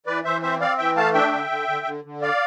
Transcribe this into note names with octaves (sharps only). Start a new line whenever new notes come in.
E3 B4 D5
E3 C5 E5
C4 C5 E5
C4 D5 F5
E3 E5 G5
A3 F5 A5
D4 E5 G5
D3
D3
D3
D3
D3
D5 F5